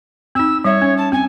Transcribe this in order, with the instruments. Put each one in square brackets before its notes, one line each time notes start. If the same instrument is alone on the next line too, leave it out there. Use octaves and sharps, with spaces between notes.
[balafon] C4 D#4 [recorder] E6
[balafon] G3 E5 [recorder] C#5
[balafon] C#4
[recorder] A5
[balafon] C4 [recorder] G#5